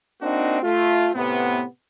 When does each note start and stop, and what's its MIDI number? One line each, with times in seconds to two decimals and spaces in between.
0.22 0.60 58
0.22 0.60 60
0.22 0.60 62
0.22 0.60 63
0.22 0.60 66
0.63 1.10 57
0.63 1.10 65
1.15 1.64 45
1.15 1.64 48
1.15 1.64 59